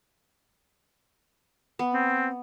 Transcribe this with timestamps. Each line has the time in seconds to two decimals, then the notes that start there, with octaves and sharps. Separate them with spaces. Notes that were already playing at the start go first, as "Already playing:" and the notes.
1.79 B3
1.94 C4